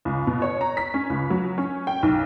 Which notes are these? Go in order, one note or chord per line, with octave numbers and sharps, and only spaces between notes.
C#2
B2
C#5
A#5
B6
C#4
C#2
F#3
C#4
G5
B1